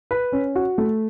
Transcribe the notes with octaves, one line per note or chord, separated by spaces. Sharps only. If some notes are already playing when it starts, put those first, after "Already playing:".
B4
C#4
F#4
A3